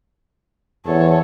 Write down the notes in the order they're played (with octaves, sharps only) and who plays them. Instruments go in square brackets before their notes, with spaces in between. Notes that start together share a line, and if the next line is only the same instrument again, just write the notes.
[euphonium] E2 [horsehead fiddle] A4 C#5